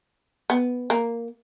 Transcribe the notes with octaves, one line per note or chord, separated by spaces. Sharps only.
B3
A#3